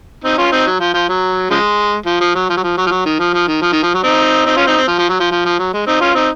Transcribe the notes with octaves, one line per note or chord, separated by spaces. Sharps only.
C4 D#4
C#4 F4
C4 D#4
F#3
F3
F3
F#3
C#3 F3 G#3
F3
F3
F#3
F3
F#3
F3
F#3
F3
F#3
D#3
F3
F3
D#3
F3
D#3
F3
F#3
C4 D#4
C4 D#4
C#4 F4
C4 D#4
C4
F3
F3
F#3
F3
F3
F3
F#3
G#3
C4 D#4
C#4 F4
C4 D#4